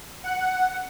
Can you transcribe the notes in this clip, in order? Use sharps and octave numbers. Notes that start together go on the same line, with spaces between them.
F#5